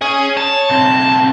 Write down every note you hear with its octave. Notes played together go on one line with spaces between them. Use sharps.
G#4 C#5 G#5
C#5 A5
B1 C4